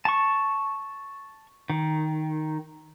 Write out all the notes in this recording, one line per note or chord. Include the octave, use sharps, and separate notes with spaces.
A5 C#6
D#3